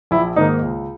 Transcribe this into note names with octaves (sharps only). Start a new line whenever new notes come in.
A#1 E4
G#2 D#3 A#3 D#4
C#2